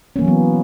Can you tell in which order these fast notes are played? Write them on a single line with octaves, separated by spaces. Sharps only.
C#4 A#3 E3 F#3 B3